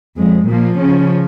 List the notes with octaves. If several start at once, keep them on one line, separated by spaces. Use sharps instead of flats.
F2 F3 G#3
A#2 F3 A#3
C#3 C#4